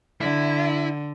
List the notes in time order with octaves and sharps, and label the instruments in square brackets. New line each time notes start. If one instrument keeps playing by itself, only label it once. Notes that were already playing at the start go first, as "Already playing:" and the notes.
[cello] D3 [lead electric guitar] E4